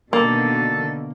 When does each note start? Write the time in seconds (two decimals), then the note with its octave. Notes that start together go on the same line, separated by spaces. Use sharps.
0.13 B2 D3 D#3 A#3 A4